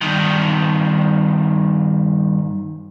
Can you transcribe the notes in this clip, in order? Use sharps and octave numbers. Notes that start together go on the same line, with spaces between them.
G2 D#3